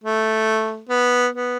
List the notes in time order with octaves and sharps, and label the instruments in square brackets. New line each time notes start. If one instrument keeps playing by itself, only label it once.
[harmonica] A3
B3
B3